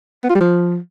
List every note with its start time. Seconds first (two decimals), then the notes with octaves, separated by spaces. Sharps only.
0.24 B3
0.30 F4
0.35 G3
0.41 F3